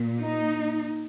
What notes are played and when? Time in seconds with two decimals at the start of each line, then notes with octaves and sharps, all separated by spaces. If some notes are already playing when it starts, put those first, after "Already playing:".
Already playing: A#2
0.20 D#4